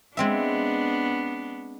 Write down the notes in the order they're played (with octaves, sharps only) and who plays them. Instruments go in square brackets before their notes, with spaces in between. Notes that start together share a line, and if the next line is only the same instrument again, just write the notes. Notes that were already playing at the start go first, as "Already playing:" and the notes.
[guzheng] G#3 C4 E5 [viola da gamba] B3 D4